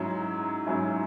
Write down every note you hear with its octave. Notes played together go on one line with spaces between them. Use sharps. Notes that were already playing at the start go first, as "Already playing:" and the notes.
Already playing: G#2 F#3 C#4 E4
G#2 F#3 C#4 E4